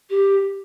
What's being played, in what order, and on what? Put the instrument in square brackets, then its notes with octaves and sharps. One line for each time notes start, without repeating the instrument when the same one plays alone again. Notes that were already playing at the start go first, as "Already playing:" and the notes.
[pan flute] G4